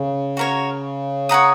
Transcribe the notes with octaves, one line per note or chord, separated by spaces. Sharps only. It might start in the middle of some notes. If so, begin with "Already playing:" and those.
Already playing: C#3
F#4 A#4 C#5
C#5 F#5 A#5 D#6